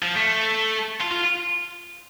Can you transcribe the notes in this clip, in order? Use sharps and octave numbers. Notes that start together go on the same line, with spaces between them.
F3
A3
F4
F4